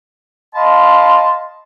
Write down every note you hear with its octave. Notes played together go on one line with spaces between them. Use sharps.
D#5 F5 A5 B5 C6